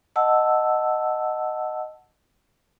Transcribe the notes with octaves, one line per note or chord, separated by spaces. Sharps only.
D#5 F#5 A5 E6